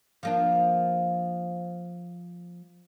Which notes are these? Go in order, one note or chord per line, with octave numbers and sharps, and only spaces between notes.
F3 A#3 D4